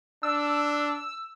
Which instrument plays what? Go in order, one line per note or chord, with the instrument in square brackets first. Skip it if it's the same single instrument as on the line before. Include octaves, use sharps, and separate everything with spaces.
[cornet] D4 [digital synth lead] E6